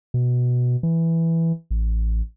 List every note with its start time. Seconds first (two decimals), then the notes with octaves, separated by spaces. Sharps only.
0.14 B2
0.83 E3
1.71 A1